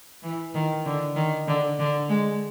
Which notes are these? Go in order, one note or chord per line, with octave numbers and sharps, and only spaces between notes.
E3
D#3
D3
D#3
D3
D3
G#3